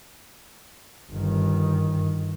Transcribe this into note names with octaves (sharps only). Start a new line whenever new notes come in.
G1 D#3